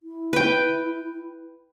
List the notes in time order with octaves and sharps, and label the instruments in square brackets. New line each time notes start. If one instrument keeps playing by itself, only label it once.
[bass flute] E4
[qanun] B4 G5